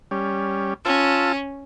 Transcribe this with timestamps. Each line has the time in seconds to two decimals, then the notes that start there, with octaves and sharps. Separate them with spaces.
0.11 G3 C#4
0.85 C#4 F4 A5 E6